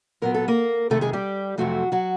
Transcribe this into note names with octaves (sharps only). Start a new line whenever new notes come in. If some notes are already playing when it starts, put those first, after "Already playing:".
A#2 F#3 B3 A#4
A4
A#3 A#4
F2 C3 D#3 A3 A4
G#3 G#4
G3 G4
F2 C3 F3 F#3 A3 F#4
F#3 F#4